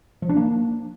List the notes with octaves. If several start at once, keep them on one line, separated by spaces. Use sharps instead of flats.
F3
D4
A#3